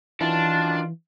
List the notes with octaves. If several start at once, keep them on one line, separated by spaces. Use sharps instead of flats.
F#2 D#3 E3 D4 F4 A5